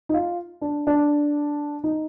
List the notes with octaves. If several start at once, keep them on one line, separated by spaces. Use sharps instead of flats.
D#4
F4
D4
D4
D#4